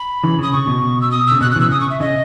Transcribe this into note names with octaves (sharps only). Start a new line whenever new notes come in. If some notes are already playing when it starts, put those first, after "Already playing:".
Already playing: B5
C#3 E3
C#3 D#6
C#3 C#6
B2
E6
D#6
C#3 E6
B2 F#6
F#6
C#3 E3 E6
C#3 D#6
C#6
E5
C#3 D#5